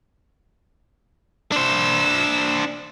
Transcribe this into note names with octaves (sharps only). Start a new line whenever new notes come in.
D4 C5 E6